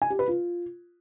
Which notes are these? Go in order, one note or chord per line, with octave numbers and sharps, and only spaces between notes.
G#5
G4
B4
F4